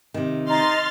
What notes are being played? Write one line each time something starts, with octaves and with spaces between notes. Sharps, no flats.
C3 D#3
D#4 D#5 C6 F6 A6